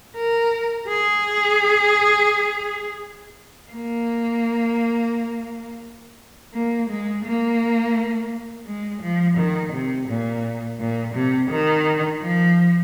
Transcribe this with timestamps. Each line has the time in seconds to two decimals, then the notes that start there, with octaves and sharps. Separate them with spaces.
0.17 A#4
0.88 G#4
3.71 A#3
6.55 A#3
6.90 G#3
7.25 A#3
8.67 G#3
9.02 F3
9.38 D#3
9.73 C3
10.09 A#2
10.80 A#2
11.15 C3
11.51 D#3
12.22 F3